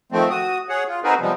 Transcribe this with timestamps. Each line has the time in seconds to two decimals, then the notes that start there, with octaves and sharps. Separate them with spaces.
0.12 D#3 F3 A3 C4
0.30 F#4 D#6
0.69 G#4 C#5 F#5
0.88 F4
1.04 C4 D#4 F#4 G#4 A#4 B4
1.20 C3 F3 G3 G#3 B3